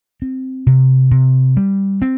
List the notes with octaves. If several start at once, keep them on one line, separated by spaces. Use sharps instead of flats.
C4
C3
C3
G3
C4